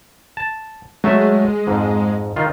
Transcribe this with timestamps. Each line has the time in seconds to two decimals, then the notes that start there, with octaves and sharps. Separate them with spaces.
0.37 A5
1.04 F#3 G#3 A3 E5
1.67 F2 G#2
2.36 D#3 F4